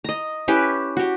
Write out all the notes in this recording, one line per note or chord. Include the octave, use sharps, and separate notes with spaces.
D#5 A#5
C#4 E4 G4 B4
F#4 G4